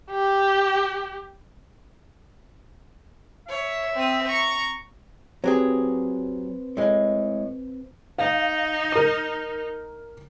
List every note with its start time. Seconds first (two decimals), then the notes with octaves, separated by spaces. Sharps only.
0.11 G4
3.48 C#5 E5
3.95 C4 D#6
4.28 A#5 C#6
5.44 F#3 C4 G4 G#4 B4 C5
6.77 A2 G#3
8.18 D#4 F5
8.92 A#4 D#7